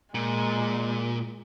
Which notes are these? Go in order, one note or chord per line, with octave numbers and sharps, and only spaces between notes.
A#2 G#3